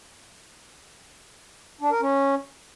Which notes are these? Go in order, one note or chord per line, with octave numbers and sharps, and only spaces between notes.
D4
A#4
C#4